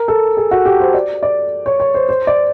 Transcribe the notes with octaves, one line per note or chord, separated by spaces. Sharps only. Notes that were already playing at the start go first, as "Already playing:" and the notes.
Already playing: A#4
A4
G#4
F#4
G4
C5
D5
D5
C#5
C#5
C5
C5
D5